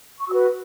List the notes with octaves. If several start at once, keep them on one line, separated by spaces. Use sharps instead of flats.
C#6
F#4 B4 E6